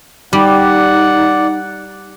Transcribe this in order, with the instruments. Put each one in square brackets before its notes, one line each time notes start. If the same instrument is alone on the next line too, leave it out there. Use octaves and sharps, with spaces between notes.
[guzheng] G3 [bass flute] D#4 [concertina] D5 [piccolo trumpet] F#5